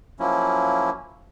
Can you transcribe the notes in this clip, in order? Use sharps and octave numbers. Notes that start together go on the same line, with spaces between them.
F3 F#3 A#3 C#4 E4